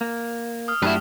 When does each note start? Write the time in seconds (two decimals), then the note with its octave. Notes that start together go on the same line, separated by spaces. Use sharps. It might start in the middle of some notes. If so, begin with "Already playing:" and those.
0.01 A#3
0.68 D#6 F6
0.83 F#2 A3 D4 E4 F#4 G4 B4